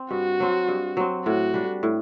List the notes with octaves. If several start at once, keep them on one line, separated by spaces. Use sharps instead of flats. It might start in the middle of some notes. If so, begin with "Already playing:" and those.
Already playing: C4
G2 F#4
F#3 C4
G2
F#3 C4
A2 F#4
G3 D4
A2